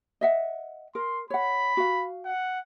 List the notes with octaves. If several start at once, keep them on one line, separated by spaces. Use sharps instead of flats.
D#5 E5 F#5
A#4 C6
C#5 F#5 B5
F#4 F5
F#5